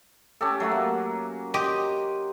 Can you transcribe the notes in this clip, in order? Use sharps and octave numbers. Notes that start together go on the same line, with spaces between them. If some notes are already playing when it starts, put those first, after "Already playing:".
C#4 G4 A4
F#3 A3 F#4
A#3
G4 D#5 C6